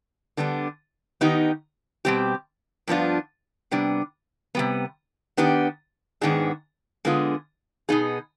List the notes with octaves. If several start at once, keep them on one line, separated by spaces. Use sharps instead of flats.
D3 G3 B3 D4
D#3 B3 D#4 G4
B2 G3 C4 G4
G2 F3 B3 D4 F4
C3 G3 B3 D4
C3 G3 B3
D#3 B3 D4 G4
G#2 D#3 B3 D4 G#4
D3 G#3 B3 F4 G#4
B2 B3 D#4 G#4